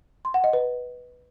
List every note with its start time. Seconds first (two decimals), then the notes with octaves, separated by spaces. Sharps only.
0.25 C6
0.34 F#5
0.44 D#5
0.53 B4